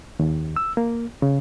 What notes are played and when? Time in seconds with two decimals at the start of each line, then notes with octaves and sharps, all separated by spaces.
0.19 D#2
0.56 E6
0.77 A#3
1.22 C#3